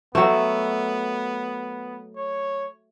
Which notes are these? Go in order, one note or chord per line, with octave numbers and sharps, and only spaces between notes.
F#3 A3 B3
C#5